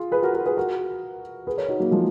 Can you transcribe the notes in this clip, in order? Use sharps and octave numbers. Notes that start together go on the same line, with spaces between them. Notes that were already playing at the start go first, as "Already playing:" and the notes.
Already playing: F4 G#4
G#4 B4
F#4 A#4
F#4 A#4
G#4 B4
F#4 A#4
G#4 B4
A#4 C#5
D#4 F#4
F#3 A#3
F3 G#3